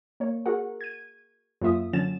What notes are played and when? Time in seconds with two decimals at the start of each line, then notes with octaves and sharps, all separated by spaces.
0.20 A#3 C#5
0.46 F#4 G#4 A#4 F#5
0.81 G#6 D#7
1.61 F#2 A#3 F4 E5 D#6
1.93 D3 F#3 C#4 A6 E7